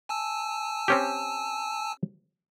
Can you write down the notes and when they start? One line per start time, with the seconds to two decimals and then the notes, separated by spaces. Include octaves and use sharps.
0.09 G#5 A5 E6
0.88 C4 C#4 G4